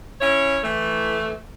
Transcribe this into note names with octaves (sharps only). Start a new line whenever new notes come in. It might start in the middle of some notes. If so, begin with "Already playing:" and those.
C#4 E4 C#5
E3 A3